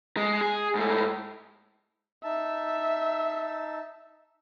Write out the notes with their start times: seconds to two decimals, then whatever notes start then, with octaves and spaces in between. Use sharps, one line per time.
0.17 G#3
0.41 G#4
0.75 G#2 A3
2.24 D#4 E5 A5